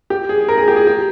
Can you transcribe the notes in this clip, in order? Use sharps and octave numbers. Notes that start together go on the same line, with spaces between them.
G4
G#4
A#4
G#4
G4
G#4
G4